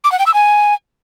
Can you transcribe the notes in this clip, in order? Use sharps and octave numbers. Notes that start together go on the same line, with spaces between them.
D6
F#5
G5
E6
G#5